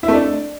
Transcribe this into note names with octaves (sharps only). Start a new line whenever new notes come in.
E4
A3
D4